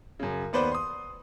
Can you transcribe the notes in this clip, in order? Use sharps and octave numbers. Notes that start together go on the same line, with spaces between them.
F#2 C#3
D#2 B3 B4 C5 D5
C6 D#6